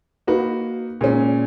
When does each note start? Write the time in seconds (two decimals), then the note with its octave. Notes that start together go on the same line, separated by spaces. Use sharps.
0.27 A#3 D#4 F#4 B4
1.01 A#2 G#3 C#4